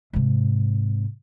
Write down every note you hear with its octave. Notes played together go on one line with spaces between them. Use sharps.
G#2 C3